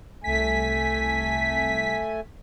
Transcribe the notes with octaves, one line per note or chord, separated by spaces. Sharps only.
C2 A3 G#5 B6